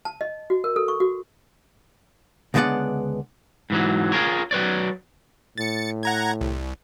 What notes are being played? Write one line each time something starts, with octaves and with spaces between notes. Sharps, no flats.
A5
D#5
F#4
A#4
A4
C#6
F#4
C#2 D3 G#3 B3 D5 F#5
G#2 E3 F#3
F4 G#4 A#4 C#5
F#3 B4 C#5 D5
A2 A6 C#7
F#5 A#5 G#6
C2